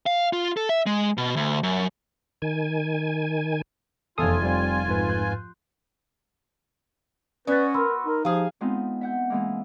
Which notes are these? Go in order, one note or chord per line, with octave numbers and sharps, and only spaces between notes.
F5
F4
A4
E5
G#3
B2
D2
F#2
D#3 G#5
F1 E2 F4 A4 F5 G#5 D#6 C7
G3 C4
F2 G#2 B4
C6 F#6 G6
B3 C#4 F#4 B4 D5 A6
A#4 B5 C6 E6
D#4 A#4
F3 G4 G#4 F5
G#3 B3 C4 D#4 F4
E5 F#5 G6
E3 G#3 A#3